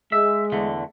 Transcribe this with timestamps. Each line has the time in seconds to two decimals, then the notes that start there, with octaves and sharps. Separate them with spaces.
0.12 G#3 E5
0.52 E2 D3 A3